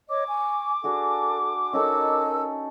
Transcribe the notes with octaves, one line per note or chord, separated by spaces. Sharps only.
C#5 D#5 D6
G#5 C#6
D4 F#4 G#4 A4
C#4 D#4 A4 A#4 D#5 E6